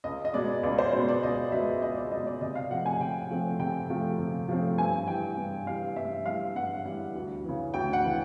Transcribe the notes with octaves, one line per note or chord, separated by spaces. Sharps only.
C#2 D#5
D#5
B2 G#3 B3 D5
C#2 D5
C5
B2 G#3 B3 C5
D5
C#2 D#5
B2 G#3 B3 E5
C#2 D#5
D5
B2 G#3 B3 D#5
D5
C3 D#5
F5
F3 A3 C4 F#5
G#5
C3 G5
F3 A3 C4
C3 G5
F3 A3 C4
C3
F3 A3 C4
G2 G#5
E3 G3 G5
G2
E3 G3 F5
G2 E5
E3 G3 F5
G2 F#5
E3 G3
D2
C#3 E3
D2 G5
F#5
C#3 E3